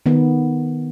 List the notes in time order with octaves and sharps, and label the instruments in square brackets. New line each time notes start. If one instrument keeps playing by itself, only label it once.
[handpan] D#3 B3